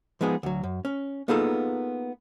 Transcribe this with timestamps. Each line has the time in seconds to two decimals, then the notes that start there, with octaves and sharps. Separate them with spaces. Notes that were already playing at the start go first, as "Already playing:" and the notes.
0.21 F3 G#3 B3 D#4 G#4
0.43 D2 F#3
0.63 F#2
0.85 C#4
1.28 A#3 B3 D#4 F4 G#4 A4